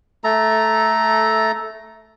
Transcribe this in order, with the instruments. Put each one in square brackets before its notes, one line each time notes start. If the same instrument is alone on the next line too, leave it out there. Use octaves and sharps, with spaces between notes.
[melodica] A3 A4 A#5